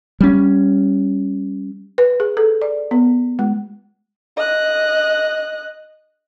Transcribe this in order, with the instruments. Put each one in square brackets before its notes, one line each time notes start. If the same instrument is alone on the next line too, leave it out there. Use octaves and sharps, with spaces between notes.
[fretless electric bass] G3 C#4
[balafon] B4
G#4
A4
D5
B3
G#3
[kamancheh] D#5 F#6